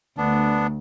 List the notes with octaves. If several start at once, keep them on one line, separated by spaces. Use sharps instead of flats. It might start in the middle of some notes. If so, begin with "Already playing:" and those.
D2 B3 D4